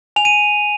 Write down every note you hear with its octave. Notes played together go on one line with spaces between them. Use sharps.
G#5 F7
D#7